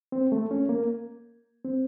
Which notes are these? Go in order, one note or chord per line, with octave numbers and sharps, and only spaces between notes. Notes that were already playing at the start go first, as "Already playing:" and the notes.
C4
A3
C#4
A#3
C4